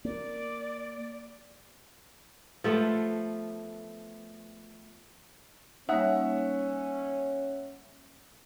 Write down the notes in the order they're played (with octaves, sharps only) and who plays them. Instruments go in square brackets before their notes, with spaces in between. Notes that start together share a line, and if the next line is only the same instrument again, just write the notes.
[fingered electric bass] A#3 [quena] D5
[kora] F3 A3 B3
[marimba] G3 A#3 D#4 [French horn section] C#4 [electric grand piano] E5 F#5